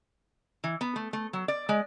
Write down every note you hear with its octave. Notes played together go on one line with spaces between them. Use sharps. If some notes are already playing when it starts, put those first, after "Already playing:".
E3
B3
A3
A3
F#3
D5
G#3